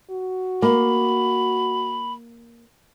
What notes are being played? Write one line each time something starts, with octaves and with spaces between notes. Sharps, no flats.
F#4
A#3 B5